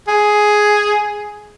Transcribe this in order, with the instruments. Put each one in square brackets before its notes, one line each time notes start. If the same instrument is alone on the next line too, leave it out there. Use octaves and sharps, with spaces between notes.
[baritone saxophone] G#4